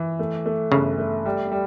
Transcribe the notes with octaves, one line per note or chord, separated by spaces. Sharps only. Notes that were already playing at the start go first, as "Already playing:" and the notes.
Already playing: E3
A3
A3
G1 C#3
A3
G3
G3